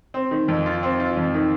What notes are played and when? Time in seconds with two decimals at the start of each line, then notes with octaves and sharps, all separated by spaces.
0.14 C4
0.31 D#3
0.48 F2
0.66 F4
0.83 C4
1.00 F4
1.17 F2
1.34 D#3